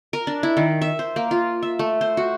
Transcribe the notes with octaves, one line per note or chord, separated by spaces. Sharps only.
A#4
D4
E4
D#3
E5
C5
A#3
F4
E5
A3
C5
F#4